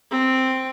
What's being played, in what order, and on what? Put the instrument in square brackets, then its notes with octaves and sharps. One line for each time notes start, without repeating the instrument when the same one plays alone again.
[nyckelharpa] C4